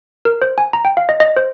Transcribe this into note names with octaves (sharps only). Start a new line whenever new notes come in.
A#4
C5
G#5
A#5
G5
F5
D#5
D#5
C5